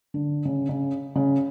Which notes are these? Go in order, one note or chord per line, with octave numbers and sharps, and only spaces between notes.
D3
C#3
C#3
C#3